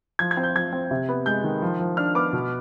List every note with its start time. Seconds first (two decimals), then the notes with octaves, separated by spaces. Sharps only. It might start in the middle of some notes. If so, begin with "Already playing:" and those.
0.19 F3 G#6
0.31 G#6
0.37 C4
0.43 G6
0.55 F3 G#6
0.73 C4
0.91 C3
1.09 B3
1.26 G#3 G6
1.44 D#3
1.62 F3
1.80 F3
1.97 D4 F6
2.15 B3 D6
2.33 B2